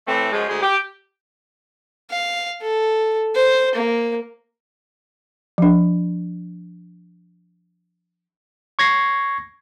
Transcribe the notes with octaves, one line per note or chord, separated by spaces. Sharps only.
A2 E3 A3 C4
F#2 F3 G#3
D2 G#3 G#4
G4
F5
A4
C5
A#3
F3 D4
C#6 G#6 A#6 C7